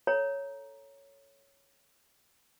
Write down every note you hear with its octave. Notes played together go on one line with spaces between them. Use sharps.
A4 C#5 A#5